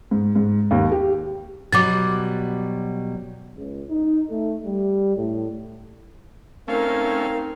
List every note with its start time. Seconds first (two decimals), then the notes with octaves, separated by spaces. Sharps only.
0.11 G#2
0.35 G#2
0.71 D#2
0.92 G4
1.72 B2 F#3 G3 D6 A6
3.57 C#2
3.90 D#4
4.29 A3
4.66 G3
5.17 A2
6.68 A3 C4 C#4 D#4 A#4 F5